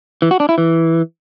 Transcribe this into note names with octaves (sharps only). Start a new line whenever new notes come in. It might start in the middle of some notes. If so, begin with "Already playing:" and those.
E3
F#4
D4
E4
E3